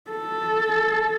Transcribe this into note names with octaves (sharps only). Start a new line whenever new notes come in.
A4